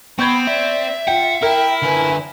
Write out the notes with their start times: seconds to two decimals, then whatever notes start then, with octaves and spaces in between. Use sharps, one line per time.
0.19 B3 C4 B5 C#6 G6 G#6
0.47 D5 E5
1.08 F4 F#5 G5
1.42 E4 A#4 G5
1.82 D3 B4 G#5